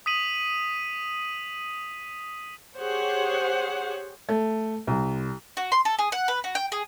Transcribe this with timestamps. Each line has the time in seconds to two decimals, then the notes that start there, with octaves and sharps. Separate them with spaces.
0.06 D#6 B6 D#7 F#7
2.78 G4 G#4 C5 C#5 F#5
4.29 A3
4.87 C2
5.57 F#4
5.72 C6
5.85 A4
5.99 G#4
6.12 F#5
6.28 B4
6.44 F#4
6.55 G5
6.72 G#4